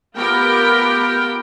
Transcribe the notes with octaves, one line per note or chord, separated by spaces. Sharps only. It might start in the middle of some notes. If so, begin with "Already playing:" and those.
B3 F4 G4 A#4 G5